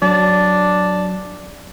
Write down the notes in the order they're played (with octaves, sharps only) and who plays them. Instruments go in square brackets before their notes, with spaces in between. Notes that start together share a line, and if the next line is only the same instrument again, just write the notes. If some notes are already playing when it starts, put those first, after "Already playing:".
[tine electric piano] F#3 [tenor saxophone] D4